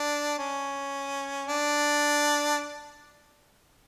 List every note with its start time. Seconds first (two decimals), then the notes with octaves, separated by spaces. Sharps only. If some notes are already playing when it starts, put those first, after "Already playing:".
Already playing: D4
0.38 C#4
1.47 D4